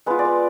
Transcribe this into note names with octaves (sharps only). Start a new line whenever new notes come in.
G#3 B3 F4 B4
D5
B4